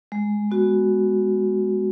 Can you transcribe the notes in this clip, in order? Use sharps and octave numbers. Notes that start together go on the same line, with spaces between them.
G#3
B3 F#4